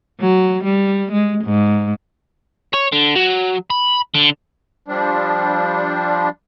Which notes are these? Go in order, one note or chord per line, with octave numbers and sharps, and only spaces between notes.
F#3
G3
G#3
G#2
C#5
D3
F#3
B5
D3
F3 G3 D4